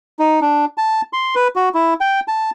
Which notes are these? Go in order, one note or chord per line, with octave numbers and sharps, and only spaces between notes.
D#4
D4
A5
C6
B4
F#4
E4
G5
A5